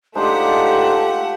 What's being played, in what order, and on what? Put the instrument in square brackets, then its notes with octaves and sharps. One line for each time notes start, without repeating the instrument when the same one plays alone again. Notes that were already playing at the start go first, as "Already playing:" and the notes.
[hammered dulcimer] G#3 F4 [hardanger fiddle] A3 F#5 [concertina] D4 D#4 C5 [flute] G4